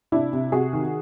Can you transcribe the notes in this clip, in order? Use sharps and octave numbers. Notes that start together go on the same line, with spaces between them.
C3 D4 E4
C3
C3 F#4 G#4
D#3